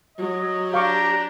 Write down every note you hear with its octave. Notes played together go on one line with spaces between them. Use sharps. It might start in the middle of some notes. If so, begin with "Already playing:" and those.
F#3 D#5
D4 G4 F5 A#5 C#6 D6